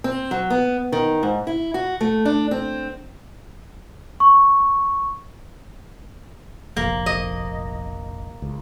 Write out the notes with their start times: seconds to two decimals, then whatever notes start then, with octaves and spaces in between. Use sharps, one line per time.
0.04 C4
0.31 F#3
0.50 B3
0.92 D#3
1.23 G#2
1.47 E4
1.74 F#4
2.01 A3
2.25 D4
2.51 C4
4.20 C#6
6.76 F1 A#1 A#3
7.06 D#5
8.42 C#2